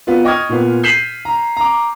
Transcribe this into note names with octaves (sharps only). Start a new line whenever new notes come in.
B3 F4
D#5 G5 C#6 D#6 F6 G#6
A#2 B3
G6 B6 C7 D#7 E7 F#7
A#5
A#5 D6